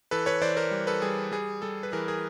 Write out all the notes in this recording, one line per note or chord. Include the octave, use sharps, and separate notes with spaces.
E3 A4 B4
B4 C#5
E3 C5 D5
A#4 C5
G3
A4 B4
G3 G#4
G3 G#4
G3 A4
B4
E3 G#4 A#4
G#4 A#4